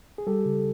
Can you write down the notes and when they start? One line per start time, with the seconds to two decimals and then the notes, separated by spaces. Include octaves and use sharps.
0.18 G#4
0.27 G3 G4 A4
0.45 C#3